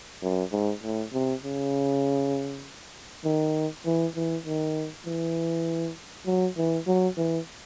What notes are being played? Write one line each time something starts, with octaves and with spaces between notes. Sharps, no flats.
F#2
G#2
A2
C3
C#3
D#3
E3
E3
D#3
E3
F#3
E3
F#3
E3